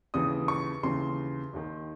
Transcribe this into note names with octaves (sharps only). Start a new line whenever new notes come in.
D#2 C#3 E3 D#6
C#6
D#2 C#3 E3 C6
D#2 D#3